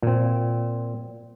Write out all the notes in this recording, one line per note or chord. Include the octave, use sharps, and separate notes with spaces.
A#2 C4